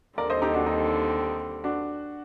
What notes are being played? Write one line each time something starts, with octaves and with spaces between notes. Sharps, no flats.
D#2 D3 G3 C4 A#4 D5
C5 D#5
D#4 G4
D4 F#4
D#4
D4 F#4